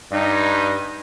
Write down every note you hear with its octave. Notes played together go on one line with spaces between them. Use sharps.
G2 D#4